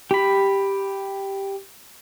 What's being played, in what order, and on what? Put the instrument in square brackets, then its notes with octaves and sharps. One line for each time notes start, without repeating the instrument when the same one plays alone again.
[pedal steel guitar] G4 B5